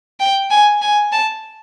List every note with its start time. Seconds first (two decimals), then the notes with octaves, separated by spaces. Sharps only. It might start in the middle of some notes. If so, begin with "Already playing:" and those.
0.20 G5
0.51 G#5
0.82 G#5
1.12 A5